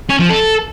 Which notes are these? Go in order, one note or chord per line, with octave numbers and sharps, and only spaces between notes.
C#4
F3
A4